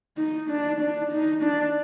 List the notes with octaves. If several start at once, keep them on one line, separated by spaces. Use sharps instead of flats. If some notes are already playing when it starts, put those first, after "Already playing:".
D#4
D4
D4
D#4
D4